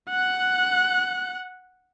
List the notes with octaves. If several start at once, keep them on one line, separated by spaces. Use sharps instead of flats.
F#5 F#6